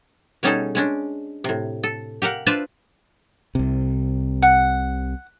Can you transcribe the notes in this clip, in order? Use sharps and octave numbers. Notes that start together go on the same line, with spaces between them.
B2 G3 C#4 D#4 G#4 A4
G#3 C#4 D4
A2 C3
A4
G4 A#4 F5 F#5
D4 F4 B4 C5 D5 E5
C2 C3
F#5